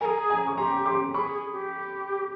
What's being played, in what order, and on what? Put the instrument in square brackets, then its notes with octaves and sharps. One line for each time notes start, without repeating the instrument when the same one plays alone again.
[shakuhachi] G#4 A#4 [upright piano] G#5 A#5
[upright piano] G#5 A#5
C#6
[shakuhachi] G4 [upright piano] A#5 C6
[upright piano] C6 D6
[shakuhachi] G#4 [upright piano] B5 C#6
[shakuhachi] G#4
G4